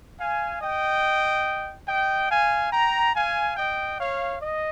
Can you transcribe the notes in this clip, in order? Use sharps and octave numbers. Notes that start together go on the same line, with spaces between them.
F5 G#5
D#5 G5
D#5 G5
F5 G#5
G5 A#5
F5 G#5
D#5 G5
C#5 F5
D#5